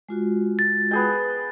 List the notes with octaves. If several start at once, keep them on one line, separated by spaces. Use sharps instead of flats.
G#3 F4 F#4
A6
B3 G#4 G5